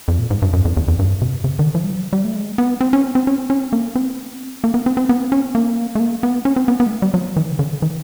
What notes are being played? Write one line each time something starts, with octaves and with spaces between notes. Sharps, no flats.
F2
A#2
G#2
G2
F#2
F2
E2
F2
G2
C3
C#3
D#3
F3
G3
F#3
G3
A3
G#3
B3
C4
C#4
C4
C4
C#4
C4
C#4
C4
A#3
C4
A#3
B3
C4
C4
B3
C4
C#4
C4
A#3
A3
A#3
B3
C#4
C4
B3
B3
G#3
A3
G3
F#3
E3
C#3
D3
E3